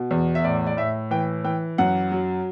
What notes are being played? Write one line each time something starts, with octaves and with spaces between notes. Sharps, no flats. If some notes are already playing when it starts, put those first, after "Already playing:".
Already playing: B2
E2
E5
A2 D5
D5
A2 E5
E3 G5
E3 G5
F#2 F#5
F#3